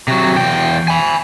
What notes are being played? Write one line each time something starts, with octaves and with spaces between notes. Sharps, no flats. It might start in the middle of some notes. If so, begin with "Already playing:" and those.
C3 F#3
E2 G5
G#5 B5